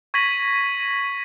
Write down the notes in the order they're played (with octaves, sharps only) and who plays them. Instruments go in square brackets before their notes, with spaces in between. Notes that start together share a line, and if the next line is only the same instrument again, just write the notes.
[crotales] C#6 G#6 A#6 B6 D#7 F#7